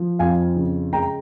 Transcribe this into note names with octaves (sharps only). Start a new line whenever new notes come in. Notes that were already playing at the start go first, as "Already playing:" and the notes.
Already playing: F3
F2 F5 G#5
C#3
G#3 G5 A#5